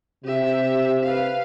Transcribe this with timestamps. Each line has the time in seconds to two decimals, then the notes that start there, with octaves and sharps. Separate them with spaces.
0.24 C3 G4 E5
1.03 B4 F5